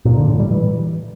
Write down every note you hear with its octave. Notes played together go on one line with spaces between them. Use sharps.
A#2
D3
A2
G3
E3